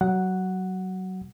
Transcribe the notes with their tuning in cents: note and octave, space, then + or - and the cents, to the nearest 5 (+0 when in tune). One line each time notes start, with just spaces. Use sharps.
F#3 +20 F#5 +0